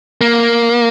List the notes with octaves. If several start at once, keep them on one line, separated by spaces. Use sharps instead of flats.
A#3